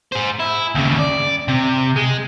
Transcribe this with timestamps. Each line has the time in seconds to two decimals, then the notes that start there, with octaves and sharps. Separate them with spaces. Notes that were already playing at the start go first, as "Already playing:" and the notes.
0.12 G#4 C5
0.39 E4
0.75 D#2 C#3
0.99 D5
1.48 C3
1.96 G#3